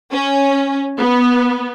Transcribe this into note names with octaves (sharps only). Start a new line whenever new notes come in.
C#4
B3